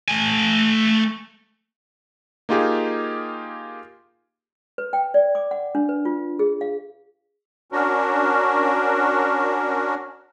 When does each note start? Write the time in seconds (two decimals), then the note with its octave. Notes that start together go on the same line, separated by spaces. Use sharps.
0.08 A3 G#5
2.49 A#3 D#4 F4 G4 G#4
4.78 B4
4.93 G5
5.14 D5
5.35 D6
5.51 F#5
5.75 D4
5.89 B4
6.05 F4
6.39 G#4
6.61 F5
7.72 C#4 D4 F#4 A#4